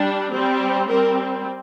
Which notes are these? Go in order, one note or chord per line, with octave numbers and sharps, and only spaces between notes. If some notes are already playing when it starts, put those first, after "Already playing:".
Already playing: G3 D4
G3 C4
G3 C4 A#4